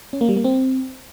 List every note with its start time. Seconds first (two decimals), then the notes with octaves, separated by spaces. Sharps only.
0.13 C#4
0.21 A#3
0.29 G3
0.37 A#3
0.44 C4